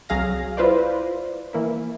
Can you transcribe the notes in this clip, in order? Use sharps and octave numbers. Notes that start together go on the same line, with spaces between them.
C2 F#3 G#4 F5 A#6
E4 F4 B4 C5 D5
E3 A#3 E4